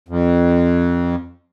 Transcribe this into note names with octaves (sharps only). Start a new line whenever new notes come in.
F2